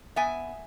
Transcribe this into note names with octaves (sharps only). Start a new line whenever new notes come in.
B3 E5 G#5